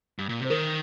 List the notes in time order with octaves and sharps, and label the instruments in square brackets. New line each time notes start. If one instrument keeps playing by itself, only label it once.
[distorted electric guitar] G2
A#2
[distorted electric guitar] C3 [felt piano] C5
[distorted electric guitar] D#3 [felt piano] A#4